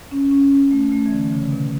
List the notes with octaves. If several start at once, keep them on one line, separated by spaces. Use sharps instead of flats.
C#4
C#4
C#4
A3
A3
E3
D3
C#3
B2